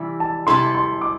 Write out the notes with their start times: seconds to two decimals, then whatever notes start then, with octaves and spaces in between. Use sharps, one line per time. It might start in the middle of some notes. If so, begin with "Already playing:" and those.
Already playing: C3 E3 G3 E4
0.20 A5
0.47 C3 E3 G3 E4 A4 C6
0.75 C6
1.01 D6